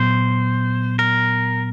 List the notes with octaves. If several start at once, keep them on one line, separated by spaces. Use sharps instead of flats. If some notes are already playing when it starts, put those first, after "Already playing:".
Already playing: A#2 F#3 B3 C5
A#4